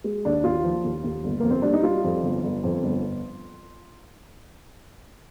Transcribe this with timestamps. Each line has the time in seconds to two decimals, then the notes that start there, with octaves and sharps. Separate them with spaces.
0.04 G#3
0.25 D#2 D4
0.44 D#2 F4
0.64 F3
0.84 D#2
1.04 D#2
1.24 G1
1.40 F2 A#3
1.51 C4
1.62 G3 D4
1.73 D#4
1.83 G3 F4
2.04 F2
2.23 G1
2.44 G1
2.64 F2
2.83 G1